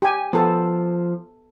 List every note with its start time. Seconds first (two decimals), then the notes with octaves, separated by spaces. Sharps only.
0.02 G4 G#5
0.33 F3 B3 A4